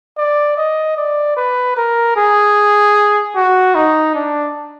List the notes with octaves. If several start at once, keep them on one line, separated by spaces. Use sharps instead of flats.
D5
D#5
D5
B4
A#4
G#4
F#4
D#4
D4